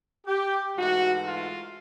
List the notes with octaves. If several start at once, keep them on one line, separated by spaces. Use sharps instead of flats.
G4
G#2 E3 A3 F#4
F4